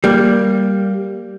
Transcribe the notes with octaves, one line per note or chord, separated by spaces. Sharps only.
G3 A#3